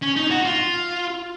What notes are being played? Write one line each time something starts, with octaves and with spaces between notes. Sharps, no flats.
C#4
D#4
F#4
F4